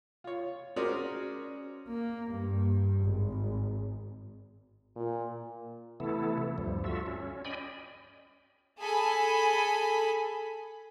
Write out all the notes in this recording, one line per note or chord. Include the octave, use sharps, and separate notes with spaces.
F4 C#5
C#4 F#4 G#4 A#4 C5 D5
A#3
G2
G#1
A#2
C3 E3 A3 B3 E4 A4
D2 G2 F3 G3
F4 F#4 A4 E5
C#4
D5 D#5 G5 G#5 B5
G#4 A4 G#5 B5